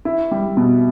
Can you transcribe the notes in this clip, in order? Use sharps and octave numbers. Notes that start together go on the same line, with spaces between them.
E4
G3
B2